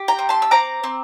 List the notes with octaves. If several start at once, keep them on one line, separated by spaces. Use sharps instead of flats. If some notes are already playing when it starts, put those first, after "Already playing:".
Already playing: G4
G5 A#5
C4
A5 C6
E6
C4 A#5 D6
C4